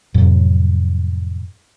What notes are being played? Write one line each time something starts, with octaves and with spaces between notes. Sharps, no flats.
F2 A2 C3 F#3